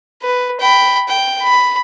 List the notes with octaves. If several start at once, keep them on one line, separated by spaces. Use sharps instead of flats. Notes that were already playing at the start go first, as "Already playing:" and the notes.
B4
G5 B5
G5
B5